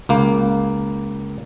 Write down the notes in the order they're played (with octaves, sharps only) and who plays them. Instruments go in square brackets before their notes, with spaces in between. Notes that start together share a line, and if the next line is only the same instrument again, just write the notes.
[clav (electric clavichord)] C#2 A#3